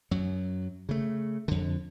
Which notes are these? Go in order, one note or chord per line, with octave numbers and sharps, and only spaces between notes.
F#2 F#3
C#3 A3
F2 D3